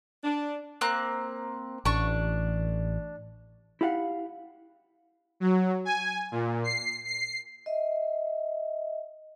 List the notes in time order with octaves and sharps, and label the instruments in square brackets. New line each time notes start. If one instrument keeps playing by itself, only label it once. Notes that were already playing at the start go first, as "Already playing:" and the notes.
[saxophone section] D4
[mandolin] A#3 C4 F#6
[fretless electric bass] A1 [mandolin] D4 C#6
[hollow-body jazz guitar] E4 G4 F5 F#5
[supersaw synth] F#3
G#5
A#2
C7
C7
[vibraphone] D#5 E5